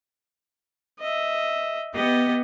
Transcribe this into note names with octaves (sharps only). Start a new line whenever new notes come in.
D#5 E5
B3 G4 D#5